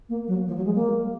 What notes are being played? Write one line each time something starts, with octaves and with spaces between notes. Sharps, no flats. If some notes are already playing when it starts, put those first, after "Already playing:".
A#3
F#3
F3
F#3
G#3
A#3